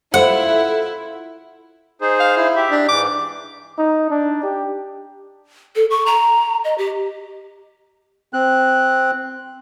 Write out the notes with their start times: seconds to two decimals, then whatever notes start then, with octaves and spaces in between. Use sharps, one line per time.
0.14 E4 F4 A4 C5 F#5
2.01 D#4 G#4 C5
2.20 F5
2.37 E4
2.56 G4 E5
2.71 D4
2.89 G#2 E3 D6
3.78 D#4
4.10 D4
4.43 G4
5.76 A4
5.91 C#6
6.06 A#5
6.64 D#5
6.78 G4
8.33 C4 F#6